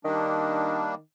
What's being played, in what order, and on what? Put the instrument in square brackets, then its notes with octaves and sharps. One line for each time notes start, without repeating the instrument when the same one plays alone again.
[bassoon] D#3 [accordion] G3 A#3 D4